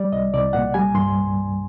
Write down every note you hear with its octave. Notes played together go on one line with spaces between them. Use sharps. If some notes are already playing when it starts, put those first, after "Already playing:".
Already playing: G3 D5
C2 D#5
C2 D5
A#2 F#5
G3 G#5
G2 C6